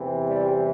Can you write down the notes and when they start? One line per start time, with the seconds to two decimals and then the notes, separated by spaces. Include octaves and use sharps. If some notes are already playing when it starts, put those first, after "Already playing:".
Already playing: E2 C3 E3
0.28 G3